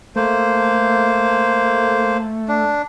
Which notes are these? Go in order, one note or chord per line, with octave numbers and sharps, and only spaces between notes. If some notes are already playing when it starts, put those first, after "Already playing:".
A3 A#3 C5
D4